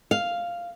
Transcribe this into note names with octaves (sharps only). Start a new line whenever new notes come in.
F5